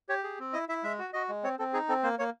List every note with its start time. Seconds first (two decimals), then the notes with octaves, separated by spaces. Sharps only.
0.09 G4 C#5
0.24 G#4
0.39 C4
0.53 E4 D#5
0.69 E4 E5
0.83 G#3 E5
0.99 F#4
1.13 F#4 D#5
1.29 G#3
1.43 C4 C#5
1.59 C4 A4
1.73 D#4 G#4
1.89 C4 A4
2.03 A#3 C5
2.19 A#3 C#5